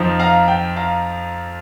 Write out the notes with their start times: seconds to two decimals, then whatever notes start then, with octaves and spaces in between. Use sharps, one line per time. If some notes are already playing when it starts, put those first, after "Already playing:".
Already playing: F2 F3 D#4
0.19 F5 A#5
0.48 G5
0.76 F5 A#5